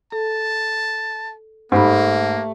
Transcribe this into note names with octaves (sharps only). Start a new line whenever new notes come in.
A4 A5
G#2 A3 A#3 G4 B5